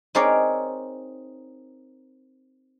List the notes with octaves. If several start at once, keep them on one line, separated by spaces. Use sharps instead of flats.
C4 D#4 G#4 A#4 C#5 D5